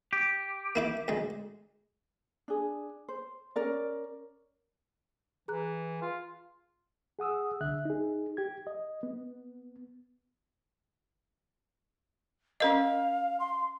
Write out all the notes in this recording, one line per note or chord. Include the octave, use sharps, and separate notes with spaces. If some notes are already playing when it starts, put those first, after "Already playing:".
G4
A#3 E4 D6
D2 G#3
D4 G#4
C5
C#4 A#4 D5
E3 G#4 A#5 F#6
F4
G#4 F#5 D#6 E6
C2 D3 E5 F#6
D#4 G#4
G4 G#6
D#5
B3
C#4 A#4 D#5 F5
C6